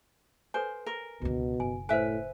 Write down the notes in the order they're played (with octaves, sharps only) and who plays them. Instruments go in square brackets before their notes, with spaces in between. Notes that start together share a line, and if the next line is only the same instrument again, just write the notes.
[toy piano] A4 B4 G#5 [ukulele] C5
[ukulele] A#4
[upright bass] C#2 D3 [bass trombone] B2
[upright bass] F#1 [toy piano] G#5
[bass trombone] A2 [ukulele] B4 E5 [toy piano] C5 G#5